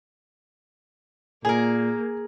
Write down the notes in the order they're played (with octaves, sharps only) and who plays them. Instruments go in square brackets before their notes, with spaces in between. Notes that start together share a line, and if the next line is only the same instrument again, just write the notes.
[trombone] A#2 [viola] A#3 [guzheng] G#4 A#4 [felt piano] G#5